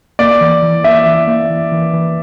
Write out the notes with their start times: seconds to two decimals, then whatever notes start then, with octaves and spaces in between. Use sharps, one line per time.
0.19 A#3 D5
0.41 E3
0.62 E3
0.84 A#3 E5
1.06 E3
1.27 A#3
1.50 E3
1.72 E3
1.93 E3